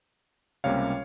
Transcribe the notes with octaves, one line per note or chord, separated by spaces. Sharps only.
C#2 C3 G3 A#3 C#4 C#5 F5